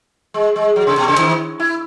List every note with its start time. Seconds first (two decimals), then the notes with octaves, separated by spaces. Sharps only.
0.34 G#3
0.56 G#3
0.76 F#3
0.87 C#3
0.98 B2
1.08 C#3
1.18 D#3
1.60 E4